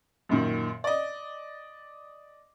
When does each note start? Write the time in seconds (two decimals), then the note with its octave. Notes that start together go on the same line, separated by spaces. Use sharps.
0.29 F#2 A#2 D#3
0.84 D5 D#5